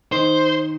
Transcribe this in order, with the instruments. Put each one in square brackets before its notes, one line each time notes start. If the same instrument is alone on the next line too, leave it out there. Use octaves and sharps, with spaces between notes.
[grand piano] D#3 D#4 [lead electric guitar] C5